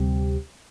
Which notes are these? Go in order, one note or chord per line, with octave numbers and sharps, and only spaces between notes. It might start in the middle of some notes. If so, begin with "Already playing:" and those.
Already playing: D2 C3 G3 C4 G4